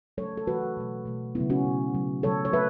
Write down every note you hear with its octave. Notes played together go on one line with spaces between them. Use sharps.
C#3 F#3 A3 A4 C#5
A4
C#3 E3 A3 F#4 B4
B2 F#3 A3
B2 A3
C#3 F#3 A3 B3 E4
C#4 F#4
B2 A3
C#3 F#3 A3
C#3 F#3 A3 A4 C#5
C#5
A3 B4 E5